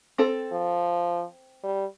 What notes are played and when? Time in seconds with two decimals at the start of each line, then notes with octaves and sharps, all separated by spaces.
0.18 C4 A4
0.52 F3
1.64 G3